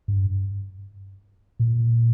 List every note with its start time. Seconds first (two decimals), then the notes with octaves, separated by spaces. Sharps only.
0.08 G2
1.60 A#2